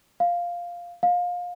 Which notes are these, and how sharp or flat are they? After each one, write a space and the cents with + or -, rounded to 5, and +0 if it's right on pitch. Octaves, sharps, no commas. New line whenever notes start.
F5 +0
F5 +25